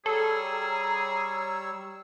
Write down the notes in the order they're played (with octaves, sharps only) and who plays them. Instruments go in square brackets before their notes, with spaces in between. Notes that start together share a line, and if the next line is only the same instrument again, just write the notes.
[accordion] G3 C#5 E6 [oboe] G#4 [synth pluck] A4 [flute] A#5